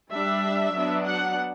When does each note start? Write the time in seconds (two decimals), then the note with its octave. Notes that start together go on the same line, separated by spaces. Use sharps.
0.11 G3 D4 E5
0.74 F#3 B3 D4
1.06 F#5